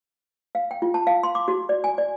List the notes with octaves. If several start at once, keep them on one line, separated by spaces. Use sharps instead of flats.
F5
G5
F4
A5
F5
C6
D6
F#4
D5
G#5
D5